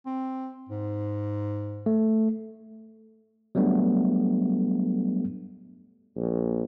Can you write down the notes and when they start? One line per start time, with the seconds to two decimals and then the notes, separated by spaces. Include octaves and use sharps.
0.06 C4
0.69 G#2
1.86 A3
3.55 F#3 G3 A3 B3 D4
6.17 A#1